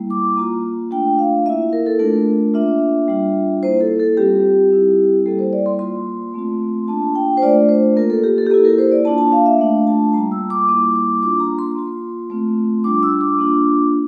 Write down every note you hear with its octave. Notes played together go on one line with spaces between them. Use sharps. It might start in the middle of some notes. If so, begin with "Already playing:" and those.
Already playing: G3 A#3 E4
D6
A#3 F4 A#5
A3 D4 F4 G5
F5
A#3 E4 E5
A#4
A4
A3 D4 F4 A#4
A#3 D4 F4 E5
G3 D4 F4
A#3 E4 C5
A4
A4
G3 C4 F4 G4
G3 C4 E4
G3 A#3 E4 A4
C5
D5
C6
A#3 F4 C6
A3 C4 F4
A#3 D4 F4 A5
G5
C5
A3 D4 F4 D5
C5
A#3 F4 A#4
A4
G4
A4
G4
A#3 E4 A4
A#4
C5
D5
A#3 D4 F4 A5
A5
F5
E5
A3 D4 F4 F5
A5
G3 A#3 F4 A#5
E6
D6
G3 A#3 E4 D6
D6
A#3 D4 F4 D6
A#5
C6
A#3 F4
A3 C4 F4
G3 D4 F4 D6
E6
D6
A#3 D4 F4